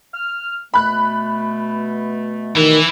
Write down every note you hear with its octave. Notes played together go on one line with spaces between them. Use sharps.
F6
B2 A3 B5 F#6
G2 B2 D#3 E3 A3 E4